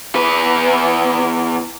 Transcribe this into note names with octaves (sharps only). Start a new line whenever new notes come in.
E2 B4